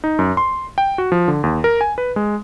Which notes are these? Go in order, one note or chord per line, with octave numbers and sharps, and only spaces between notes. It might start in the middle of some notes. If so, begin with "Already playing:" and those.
D#4
F#2
C6
G5
F#4
F3
D3
D#2
A#4
G#5
B4
G#3